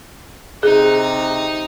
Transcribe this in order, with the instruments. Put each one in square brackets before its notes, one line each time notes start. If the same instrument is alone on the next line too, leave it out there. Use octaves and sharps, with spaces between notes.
[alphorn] C3 [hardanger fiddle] D#4 [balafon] G#4